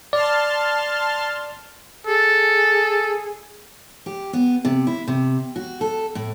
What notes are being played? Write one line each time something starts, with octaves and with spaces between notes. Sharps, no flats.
D5 A5 C6 F6
G#4 A4
G4
B3
C3
E4
C3
F#4
A4
A2